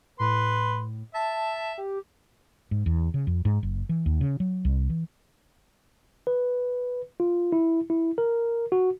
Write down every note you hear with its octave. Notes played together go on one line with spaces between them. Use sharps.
A2 B4 C6
E5 A5
G4
G#2
E2
C#3
F2
G#2
F#1
E3
D#2
C#3
F#3
C2
E3
B4
F4
E4
E4
A#4
F#4